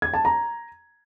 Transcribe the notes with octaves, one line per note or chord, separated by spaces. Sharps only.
G#6
A5
A#5